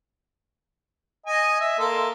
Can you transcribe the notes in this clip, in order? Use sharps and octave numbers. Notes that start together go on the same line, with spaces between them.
D#5 G#5
E5
A#3 A4 C6